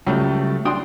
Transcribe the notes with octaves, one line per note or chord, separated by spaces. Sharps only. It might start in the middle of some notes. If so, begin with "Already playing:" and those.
C#2 F#2 C#3 G3 A3
D4 F#4 G5 C6 D#6